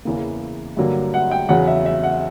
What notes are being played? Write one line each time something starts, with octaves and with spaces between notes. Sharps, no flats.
E2 C#3 E3 A#3
G2 D3 F#3 A#3
F#5
G5
E2 C#3 F#3 F#5
E5
E5
F#5